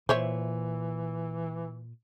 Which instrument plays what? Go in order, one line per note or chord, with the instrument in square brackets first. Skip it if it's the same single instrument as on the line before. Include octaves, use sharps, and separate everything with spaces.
[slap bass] A#2 [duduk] E3 [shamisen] C5 C#5 E5